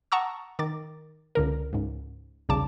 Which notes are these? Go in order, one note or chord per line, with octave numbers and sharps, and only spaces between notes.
F#5 A5 A#5 C#6 D#6 E6
D#3 D6 A6
C#2 D3 A#4
C#2 G#2
B1 E2 C#3 G3 A5 D6